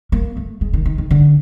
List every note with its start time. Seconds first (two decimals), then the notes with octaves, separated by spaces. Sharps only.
0.12 A#3
0.37 A3
0.61 G#3
0.73 D#3
0.86 D#3
0.98 D#3
1.11 D3